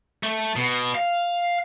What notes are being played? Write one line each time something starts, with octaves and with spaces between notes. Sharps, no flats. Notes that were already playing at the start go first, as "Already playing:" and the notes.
A3
B2
F5